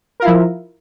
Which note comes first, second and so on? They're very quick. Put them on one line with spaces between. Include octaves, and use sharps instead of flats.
A#4 F4 E4 F3